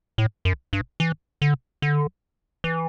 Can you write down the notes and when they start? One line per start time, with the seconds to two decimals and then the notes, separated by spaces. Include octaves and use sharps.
0.18 A2
0.45 F#2
0.73 G2
1.00 E3
1.42 D3
1.82 D3
2.64 E3